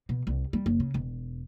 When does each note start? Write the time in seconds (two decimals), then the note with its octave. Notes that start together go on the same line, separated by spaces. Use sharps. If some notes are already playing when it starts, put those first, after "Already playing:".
0.09 B2
0.27 C2
0.53 G3
0.66 F#1
0.80 C#3
0.94 E1